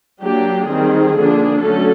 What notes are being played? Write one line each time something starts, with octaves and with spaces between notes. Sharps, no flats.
F#3 A#3 D4 G4
D#3 G3 C4 G#4
D3 F3 A#3 D4
D3 F#3 A3 C#4 A4